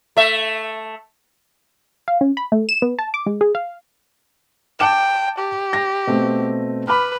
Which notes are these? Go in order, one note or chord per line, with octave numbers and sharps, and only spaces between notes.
A3 E5
F5
C#4
B5
A3
E7
B3
A5
D6
G#3
G#4
F5
G5 A5 D6 E7
G4
A#6
B2 A3 C4
B4 B5 D6 F6